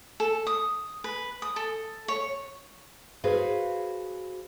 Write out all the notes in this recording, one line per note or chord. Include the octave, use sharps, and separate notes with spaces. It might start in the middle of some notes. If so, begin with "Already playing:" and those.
A4
D#6
B4
D#6
A4
C#5
F#4 G#4 B4 C5 F5